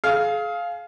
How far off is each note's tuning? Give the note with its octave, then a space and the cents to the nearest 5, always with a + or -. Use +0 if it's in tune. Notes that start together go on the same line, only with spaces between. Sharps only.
G#4 +35 F5 +0